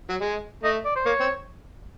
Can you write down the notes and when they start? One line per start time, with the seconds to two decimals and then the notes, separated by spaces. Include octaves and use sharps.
0.10 F#3
0.21 G#3
0.63 A3 D#5
0.85 D5
0.96 C5
1.06 A#3 C#5
1.20 C4